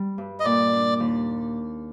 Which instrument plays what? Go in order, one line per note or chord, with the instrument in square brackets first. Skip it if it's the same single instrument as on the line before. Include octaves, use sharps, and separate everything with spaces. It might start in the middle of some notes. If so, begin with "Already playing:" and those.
Already playing: [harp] G3
G2
[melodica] D#5
[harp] A#2 [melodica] D5
[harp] D4
D#2